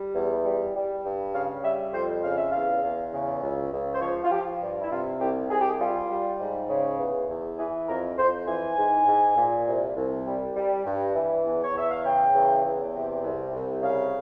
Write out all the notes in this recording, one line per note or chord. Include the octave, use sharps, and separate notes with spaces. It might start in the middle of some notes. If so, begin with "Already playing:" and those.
Already playing: G3
E2
G3
G3
G2
C#3 F5
G3 E5
F2 C5
C#3 F5
E5
E2 F5
E2
C#3
C#2
C#2
C5
F3 C#5
F4
F3 G4
G2
E4
C3 F4
C2 G4
C2 G#4
G4
G#4
G3 F4
G3
G#2
C#3
E2
E2
E3 G#4
F2 A#4
F2 C5
E3 G#5
G#2
G#2
A#2
C2
C2
G3
G3
G2
E3
E2
C#5
E2 E5
F5
C#3 G5
E2
E2
C3
C2
C2
C#3 F5